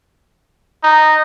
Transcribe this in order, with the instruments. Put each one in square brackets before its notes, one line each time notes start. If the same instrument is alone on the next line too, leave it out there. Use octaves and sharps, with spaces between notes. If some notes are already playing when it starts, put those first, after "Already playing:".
[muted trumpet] D#4